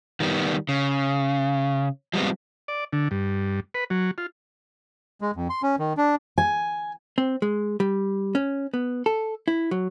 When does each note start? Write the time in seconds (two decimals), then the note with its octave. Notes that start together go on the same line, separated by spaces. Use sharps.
0.20 D#3 G3 B3
0.69 C#3
2.13 F3 G3 G#3 B3 C4
2.68 D5
2.93 D3
3.11 G2
3.75 B4
3.90 F#3
4.18 F4
5.21 G#3
5.36 F2
5.50 C6
5.62 C#4
5.79 D#3
5.97 D4
6.38 G#5
7.18 C4
7.42 G#3
7.80 G3
8.35 C#4
8.74 B3
9.06 A4
9.48 E4
9.71 F#3